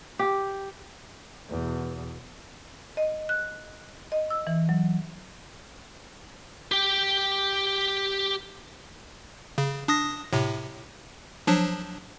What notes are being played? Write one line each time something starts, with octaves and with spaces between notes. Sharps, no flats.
G4
E2 B2
D#5
F#6
D#5
E6
E3
F#3
G4 G5
C#3
D4 D#6 A#6
A2 C3
F3 F#3 D4